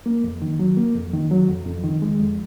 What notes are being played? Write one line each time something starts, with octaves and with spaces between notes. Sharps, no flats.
A#3
F2
D#3
F#3
A#3
F2
D#3
F#3
F2
F2
D#3
G#3
F2